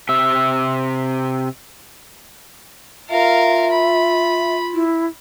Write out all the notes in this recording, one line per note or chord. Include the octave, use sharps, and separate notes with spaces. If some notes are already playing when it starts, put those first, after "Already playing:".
C3 E5
F4 A#4 E5 F5
B5
E4